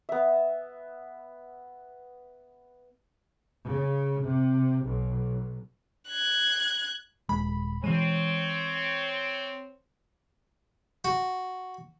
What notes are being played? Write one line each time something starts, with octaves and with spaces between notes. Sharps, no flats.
B3 E5
C#3
C3
B1
F#6 G#6
D#1 G#3 B5
E3 G#3 C4 C#5 D#7
F#4